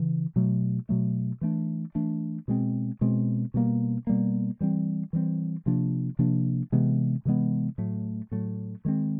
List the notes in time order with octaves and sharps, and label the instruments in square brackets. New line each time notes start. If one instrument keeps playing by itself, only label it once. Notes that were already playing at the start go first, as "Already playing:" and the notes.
Already playing: [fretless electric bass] C#3 E3
B2 F#3 A3
B2 F#3 A3
E3 A3 D4
E3 A3 D4
B2 G#3 C4
B2 G#3 C4
B2 G3 A#3
B2 G3 A#3
E3 G3 C4
E3 G3 C4
C3 F3 A#3 D4
C3 F3 A#3 D4
C3 E3 G#3 B3
C3 E3 G#3 B3
A2 F#3 A3
A2 F#3 A3
D#3 G#3 C4